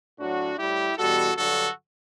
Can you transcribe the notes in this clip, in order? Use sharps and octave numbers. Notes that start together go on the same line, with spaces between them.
A2 F#3 D4 F#4
A2 G3 E4 G4
E2 B2 G3 F#4 A4
G2 D3 F#3 F#4 A4